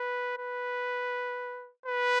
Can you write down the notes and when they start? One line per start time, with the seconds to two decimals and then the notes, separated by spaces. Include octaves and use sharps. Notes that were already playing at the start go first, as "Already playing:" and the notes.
Already playing: B4
0.38 B4
1.86 B4